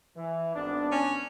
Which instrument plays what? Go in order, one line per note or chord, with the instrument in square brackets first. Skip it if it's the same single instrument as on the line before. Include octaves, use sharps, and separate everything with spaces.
[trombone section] E3
G#1 B3 D4
[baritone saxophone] C#4